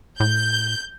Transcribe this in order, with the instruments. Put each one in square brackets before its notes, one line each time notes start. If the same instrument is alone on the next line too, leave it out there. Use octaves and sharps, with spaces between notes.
[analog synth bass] A2 [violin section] G6